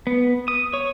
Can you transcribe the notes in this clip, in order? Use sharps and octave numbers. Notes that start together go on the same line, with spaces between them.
B3
D#6
C#5